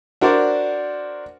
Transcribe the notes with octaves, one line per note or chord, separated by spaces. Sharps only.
D4 F#4 A#4 C5 D5